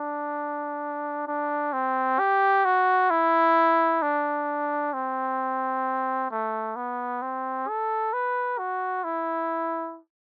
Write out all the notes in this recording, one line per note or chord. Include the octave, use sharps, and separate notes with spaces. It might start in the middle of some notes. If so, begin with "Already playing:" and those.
Already playing: D4
D4
C4
G4
F#4
E4
D4
C4
A3
B3
C4
A4
B4
F#4
E4